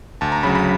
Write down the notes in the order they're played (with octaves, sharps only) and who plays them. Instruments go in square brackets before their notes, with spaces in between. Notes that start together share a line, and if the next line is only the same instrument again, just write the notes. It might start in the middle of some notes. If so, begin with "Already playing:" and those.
[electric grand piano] D2 A5
A#5
C#3 F#3 B5
B5